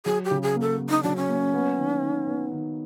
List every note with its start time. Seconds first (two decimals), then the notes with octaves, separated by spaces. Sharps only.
0.05 F#3 G#4
0.25 G4
0.31 C#3
0.43 G#4
0.55 A#3
0.61 A4
0.79 A#3
0.89 D#4
1.03 F#3 D4
1.16 C#4
1.29 A#3
1.54 B3
1.77 D#3
2.02 D#3
2.27 B3
2.52 D#3